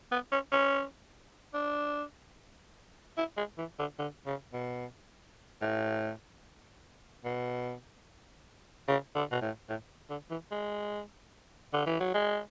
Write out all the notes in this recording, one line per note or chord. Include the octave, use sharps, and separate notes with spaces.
B3
C#4
C#4
D4
E4
G#3
E3
D3
D3
C#3
B2
A2
B2
C#3
D3
B2
A2
A2
D3
E3
G#3
D3
E3
F#3
G#3